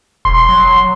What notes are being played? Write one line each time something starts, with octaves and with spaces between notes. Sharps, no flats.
E1 C6
F#3